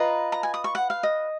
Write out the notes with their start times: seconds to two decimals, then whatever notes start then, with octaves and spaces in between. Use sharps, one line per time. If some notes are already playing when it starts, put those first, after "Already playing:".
Already playing: F4 B4 D#5 A#5
0.32 A#5
0.43 G#5
0.54 D#6
0.64 C#6
0.75 F#5
0.90 F5
1.03 D#5